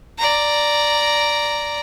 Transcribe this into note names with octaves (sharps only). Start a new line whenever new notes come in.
D5 A#5